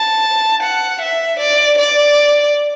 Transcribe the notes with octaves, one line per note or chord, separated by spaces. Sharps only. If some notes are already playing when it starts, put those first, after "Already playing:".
Already playing: A5
F#5
E5
D5
D5